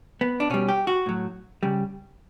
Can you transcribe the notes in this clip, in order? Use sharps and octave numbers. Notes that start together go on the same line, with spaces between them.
B3
D4
B2 G3 C#4
G4
F#4
A2 F#3
C#3 G3